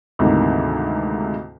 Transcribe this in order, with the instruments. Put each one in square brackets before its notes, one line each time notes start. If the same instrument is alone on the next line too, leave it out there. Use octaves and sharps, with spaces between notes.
[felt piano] D2 G#2 C3 D#3 E3 A#3